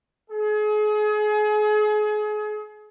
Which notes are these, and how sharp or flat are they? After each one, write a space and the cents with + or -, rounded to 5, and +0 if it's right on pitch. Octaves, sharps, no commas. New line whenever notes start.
G#4 +35